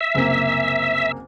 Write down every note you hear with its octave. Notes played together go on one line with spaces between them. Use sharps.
E5
F#1 C2 A#3